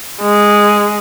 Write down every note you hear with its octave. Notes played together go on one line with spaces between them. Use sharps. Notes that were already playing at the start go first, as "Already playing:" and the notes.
G#3